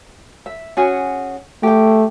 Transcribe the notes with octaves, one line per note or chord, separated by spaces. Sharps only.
E5
C#4 F#4 G#4
A3 G4 G5